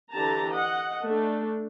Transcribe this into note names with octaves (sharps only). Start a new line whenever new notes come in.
D3 E3 G4 A5 A#5
D#5 F#5
A3 D4